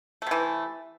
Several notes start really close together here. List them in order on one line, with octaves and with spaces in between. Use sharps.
A3 C3 E3